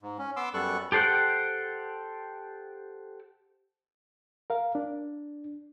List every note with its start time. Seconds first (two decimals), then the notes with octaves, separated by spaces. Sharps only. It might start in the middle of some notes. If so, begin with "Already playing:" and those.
0.02 G#2
0.19 C#4
0.36 B3 C6 D6 E6
0.54 F#2 G3 B3 A4 C#6 F#6
0.92 G4 A4 C5 F#5 G5
4.50 A#4 F5
4.75 D4